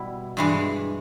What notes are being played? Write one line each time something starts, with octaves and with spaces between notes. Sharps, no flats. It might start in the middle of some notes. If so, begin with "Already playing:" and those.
Already playing: B2 G3 E4
G2 E3 G#3